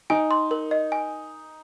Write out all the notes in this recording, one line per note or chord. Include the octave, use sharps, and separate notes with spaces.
D#4 G#5
C6
A#4
D#5
G#5